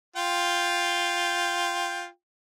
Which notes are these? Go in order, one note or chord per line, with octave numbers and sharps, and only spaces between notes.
F4 G5